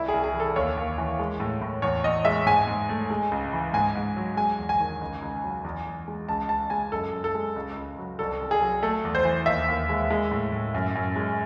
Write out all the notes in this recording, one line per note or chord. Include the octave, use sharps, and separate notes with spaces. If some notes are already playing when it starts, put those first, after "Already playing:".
Already playing: C2 E4
G#4
C2
G#4
E3
A4
D#2 C#5
D#2
E3
G#3
A2
A2
E2 C#5
E2 D#5
G#3 E5
G#2 G#5
G#2
A3
G#3
C#2
E3
G#2 G#5
G#2
F#3
G#3 G#5
E2
G#5
D#3
C#2
C#2
F#3
E2
E2
G#3
C#2 A5
C#2 A5
G#3 G#5
F#2 A4
F#2
A4
G#3
C#2
C#2
F#3
C2 A4
C2
G#4
F#3
A3 A4
E2
C5
E3
D#2 E5
D#2
G#3
G#3
A2
A2
F#2
F#2
G#3